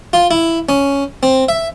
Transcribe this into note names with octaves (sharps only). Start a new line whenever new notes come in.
F4
E4
C#4
C4
E5